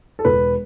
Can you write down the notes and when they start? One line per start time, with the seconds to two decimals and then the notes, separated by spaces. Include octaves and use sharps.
0.19 A4
0.25 E1 B4